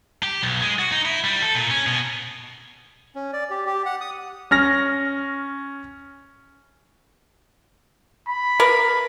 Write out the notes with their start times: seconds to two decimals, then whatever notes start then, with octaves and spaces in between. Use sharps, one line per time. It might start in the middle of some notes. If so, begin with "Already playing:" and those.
0.23 G4
0.43 B1
0.61 G#3
0.79 F#4
0.92 D#4
1.05 E4
1.24 G3
1.42 A4
1.55 A#2
1.70 C#4
1.86 B2
3.15 C#4
3.33 D5
3.50 G4
3.66 G4
3.86 F#5
4.01 D#6
4.51 C#4 F6 A#6
8.28 B5
8.60 A#4 B4